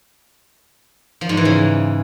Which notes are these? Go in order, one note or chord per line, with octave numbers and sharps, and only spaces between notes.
F3
G#2
E3
C#3